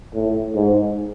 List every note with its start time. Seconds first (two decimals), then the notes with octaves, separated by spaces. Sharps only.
0.14 A2
0.55 G#2